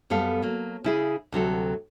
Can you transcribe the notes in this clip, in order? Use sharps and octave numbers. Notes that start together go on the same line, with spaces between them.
F#2 G3 B3 A4 F5
F#3 A#3
C#3 E4 G#4
D2 C3 F#3 A4